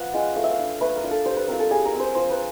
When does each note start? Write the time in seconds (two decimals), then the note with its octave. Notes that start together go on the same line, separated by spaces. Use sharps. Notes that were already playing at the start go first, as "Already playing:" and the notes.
Already playing: F3 B4 F#5
0.14 G#3 C#4 F4
0.36 A3 F5
0.44 E5
0.52 F5
0.58 D4 F4
0.81 A3 B4
0.96 A#4
1.03 D4 F4
1.11 A4
1.25 G3 C5
1.36 B4
1.48 C4 F4 A#4
1.60 A4
1.70 G3 G#4
1.85 A#4
1.93 C4 F4
2.00 C5
2.15 F3 C5
2.30 B4